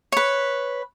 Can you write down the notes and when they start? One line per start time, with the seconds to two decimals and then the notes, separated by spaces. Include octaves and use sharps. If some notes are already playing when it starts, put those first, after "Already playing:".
0.12 B4 C#5